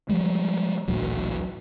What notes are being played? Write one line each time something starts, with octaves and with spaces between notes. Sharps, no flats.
F3 G3 G#3
A1 D2 A#2 F#3